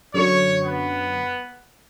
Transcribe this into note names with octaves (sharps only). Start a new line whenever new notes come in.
F#2 D3 F#3 C#5
B3